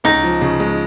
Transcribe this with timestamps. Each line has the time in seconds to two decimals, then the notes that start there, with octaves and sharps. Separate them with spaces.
0.04 C#2 D#4
0.23 F3
0.41 C#3
0.60 G#3